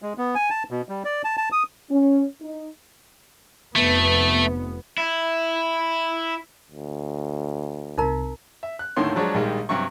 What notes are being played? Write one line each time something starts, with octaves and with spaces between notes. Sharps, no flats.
G#3
B3
G#5
A5
B2
G3
D5
A5
A5
D#6
C#4
D#4
F1 A3 B3
E4
D2
C2 C3 D#4 A#4 A#5
E5
F#6
D#2 A2 D3 D#3 C#5 C6
F3 F#3 G#3 D4 C#5
A#1 D#3 G3 G#3
G2 C3 F#3 C#6